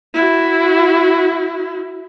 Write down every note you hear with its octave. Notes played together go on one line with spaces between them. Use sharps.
E4 F#4